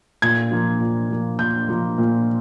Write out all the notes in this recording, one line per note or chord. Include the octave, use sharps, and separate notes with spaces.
A#2 G#6
F3 A#3
A#2
F3 A#3
A#2 G6
F3 A#3
A#2